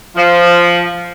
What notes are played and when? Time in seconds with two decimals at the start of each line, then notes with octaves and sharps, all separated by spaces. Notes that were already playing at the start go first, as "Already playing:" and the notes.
0.16 F3